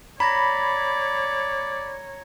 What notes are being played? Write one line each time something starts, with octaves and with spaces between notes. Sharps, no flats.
C#5 D5 A#5 B5 G#6 A#6